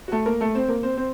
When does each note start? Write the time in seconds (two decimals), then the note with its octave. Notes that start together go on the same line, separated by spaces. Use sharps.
0.08 F#4
0.12 A3 A4
0.26 A#3 A#4
0.41 A3 A4
0.55 C4 C5
0.68 A#3 A#4
0.83 C4 C5
0.97 C4 C5